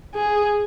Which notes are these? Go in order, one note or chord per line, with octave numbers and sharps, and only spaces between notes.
G#4